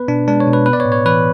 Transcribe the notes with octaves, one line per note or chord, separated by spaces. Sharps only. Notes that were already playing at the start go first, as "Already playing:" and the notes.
Already playing: B3 B4
B2 D4
G#3 D4
C#5
B2
B4
B3 B4
D5
C#5
A2
C#5
E3 B4